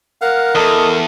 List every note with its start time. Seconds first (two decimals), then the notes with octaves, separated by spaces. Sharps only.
0.21 A#4 F5 F#5
0.55 E2 A4 D#5